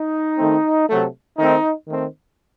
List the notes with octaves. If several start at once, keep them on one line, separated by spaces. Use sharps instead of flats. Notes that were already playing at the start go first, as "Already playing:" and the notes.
Already playing: D#4
D#3 A3 C4
C3 F#3 A3
D#3 A3 C4 D#4
D#3 A3 C4